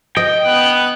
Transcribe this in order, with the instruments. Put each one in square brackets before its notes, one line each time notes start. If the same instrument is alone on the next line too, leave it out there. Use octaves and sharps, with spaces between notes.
[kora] D#5 [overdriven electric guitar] G5
[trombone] B3 [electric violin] F#6